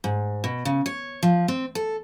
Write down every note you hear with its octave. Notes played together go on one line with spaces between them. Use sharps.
G#2
B2
C#3
C#5
F3
C4
A4